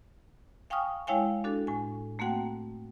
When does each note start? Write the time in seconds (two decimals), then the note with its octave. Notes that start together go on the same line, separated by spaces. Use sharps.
0.70 F5 G5 G#5 C#6 D#6 F6
1.07 G#3 E4 C#5 F5 G5 G#5
1.44 D4 F#4 A4
1.67 A2 G#5
2.19 A3 A#3 C4 F#4 F#5 G5